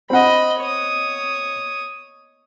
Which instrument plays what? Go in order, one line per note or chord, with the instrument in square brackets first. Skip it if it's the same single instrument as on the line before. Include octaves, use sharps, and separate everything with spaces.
[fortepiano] C4 F#5 [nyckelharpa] D#5 B5
[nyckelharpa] C#5 D#6